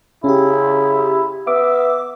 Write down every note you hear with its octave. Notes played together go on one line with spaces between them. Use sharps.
C#3 C#4 E4 G4
B3 E5 D6